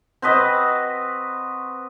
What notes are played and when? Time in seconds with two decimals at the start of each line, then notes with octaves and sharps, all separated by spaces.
0.22 C4 F#4 B4 D#5